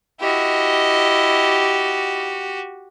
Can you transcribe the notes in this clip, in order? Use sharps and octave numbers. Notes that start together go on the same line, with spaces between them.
E4 F#4 G4 D#5